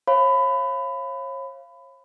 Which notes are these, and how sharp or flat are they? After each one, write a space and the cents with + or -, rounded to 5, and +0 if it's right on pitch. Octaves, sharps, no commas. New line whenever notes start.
C#5 -40 F5 -20 B5 +25